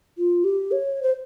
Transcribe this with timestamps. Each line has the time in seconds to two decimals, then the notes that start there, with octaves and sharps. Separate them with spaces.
0.18 F4
0.44 G4
0.72 C#5
1.02 C5